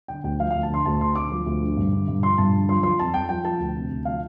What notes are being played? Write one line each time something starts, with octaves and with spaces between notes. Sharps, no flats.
D3 G5
D2 G5
F3 F5
D2 F5
A5
D3 C6
D2 A5
D3 C6
D2 D6
F3
D2
D3
G2
D3
G2
F3 C6
G2 A5
D3
F3 C6
F3 C6
F2 A5
F2 G5
F3 G5
F3 A5
D2
C3
D2
F3 F5